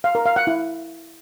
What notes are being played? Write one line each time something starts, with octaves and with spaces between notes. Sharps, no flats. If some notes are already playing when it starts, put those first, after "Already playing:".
F5
A#4
F5
F#5
E4